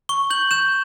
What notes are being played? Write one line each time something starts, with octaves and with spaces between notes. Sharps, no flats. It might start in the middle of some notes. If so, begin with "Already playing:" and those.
C#6 G7
G6 F#7
G6 E7